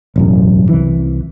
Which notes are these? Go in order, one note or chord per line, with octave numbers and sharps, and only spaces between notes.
E1 A1 F#2
C2 E3